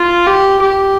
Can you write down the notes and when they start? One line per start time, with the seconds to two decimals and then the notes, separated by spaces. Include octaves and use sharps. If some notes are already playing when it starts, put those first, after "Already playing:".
Already playing: F4
0.27 G4
0.62 G4